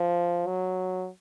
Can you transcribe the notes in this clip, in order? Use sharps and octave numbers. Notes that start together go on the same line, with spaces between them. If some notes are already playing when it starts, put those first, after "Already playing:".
Already playing: F3
F#3